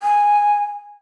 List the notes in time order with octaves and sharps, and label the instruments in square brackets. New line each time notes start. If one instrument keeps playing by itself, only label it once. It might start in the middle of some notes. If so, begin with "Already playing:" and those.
[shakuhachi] G#5